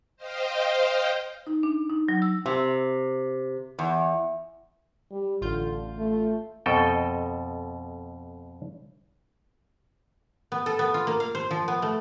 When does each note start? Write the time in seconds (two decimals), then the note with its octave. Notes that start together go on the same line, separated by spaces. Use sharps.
0.17 C5 D#5 F5 G5
1.47 D#4
1.63 D4
1.90 D#4
2.09 F#3
2.22 E6
2.46 C3
3.79 E2
5.11 G3
5.41 A1 D3 F4 G6
5.98 A3
6.66 F2 B2 A4 D#5 G5
10.52 B3
10.66 A4
10.79 B3
10.94 F4
11.07 A#3
11.20 F5
11.35 C5
11.51 F3
11.68 B3
11.82 A3